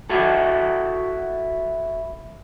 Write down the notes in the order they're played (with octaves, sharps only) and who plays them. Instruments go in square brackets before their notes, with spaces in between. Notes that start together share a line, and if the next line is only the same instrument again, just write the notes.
[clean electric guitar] E4 F#4 A4